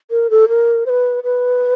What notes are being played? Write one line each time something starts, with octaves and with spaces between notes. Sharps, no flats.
A#4
A4
A#4
C5
B4
B4